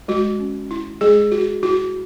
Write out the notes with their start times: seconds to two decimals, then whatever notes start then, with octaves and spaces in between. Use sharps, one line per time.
0.08 G#3 F#4
0.39 C#4
0.71 E4
1.01 G#3 G#4
1.32 E4 F#4
1.63 E4 F#4